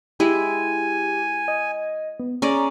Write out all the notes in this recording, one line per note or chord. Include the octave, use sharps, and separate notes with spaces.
G#3 E4 G4 G#5
D#5
B3
C#4 G#4 D5 A#5